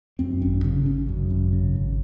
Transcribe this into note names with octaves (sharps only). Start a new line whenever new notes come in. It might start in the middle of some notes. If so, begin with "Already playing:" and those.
F#2 C4
G#1 C#4
C#3 C#4
G#1 C#4
F#2
G#1
C#3
G#1